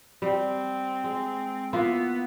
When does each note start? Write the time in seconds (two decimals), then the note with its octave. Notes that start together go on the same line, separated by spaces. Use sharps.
0.22 G3 C4
1.04 G#3
1.73 A#3 B3 E4 F4